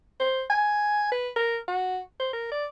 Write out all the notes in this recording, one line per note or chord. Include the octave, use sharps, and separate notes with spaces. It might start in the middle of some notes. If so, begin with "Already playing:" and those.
C5
G#5
B4
A#4
F#4
C5
A#4
D5